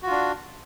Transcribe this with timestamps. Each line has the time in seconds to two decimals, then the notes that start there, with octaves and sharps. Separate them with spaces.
0.02 F#4
0.07 F4
0.11 D4